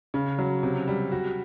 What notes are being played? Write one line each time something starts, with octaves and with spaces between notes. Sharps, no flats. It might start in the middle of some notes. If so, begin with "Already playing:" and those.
C#3
F#3
C3
G3
F#4